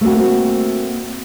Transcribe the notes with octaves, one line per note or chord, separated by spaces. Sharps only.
A3 A#3 C4 F#4